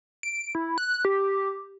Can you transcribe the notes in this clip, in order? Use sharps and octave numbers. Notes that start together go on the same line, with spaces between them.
D7
E4
F#6
G4